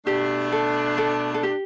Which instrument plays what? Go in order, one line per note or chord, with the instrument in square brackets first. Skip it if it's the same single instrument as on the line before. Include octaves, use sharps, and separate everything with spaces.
[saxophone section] B2 A3 D4 [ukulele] G4
[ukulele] A4
A4
A4
G4